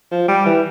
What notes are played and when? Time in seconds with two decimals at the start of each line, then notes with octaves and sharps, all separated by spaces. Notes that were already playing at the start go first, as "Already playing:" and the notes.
0.12 F3
0.28 G3
0.45 E3